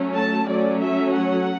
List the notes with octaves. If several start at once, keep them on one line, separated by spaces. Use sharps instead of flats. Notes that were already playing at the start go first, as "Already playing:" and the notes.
Already playing: F#3 A3 C#4
A5
F#3 A3 C#4 D5
E5
F#5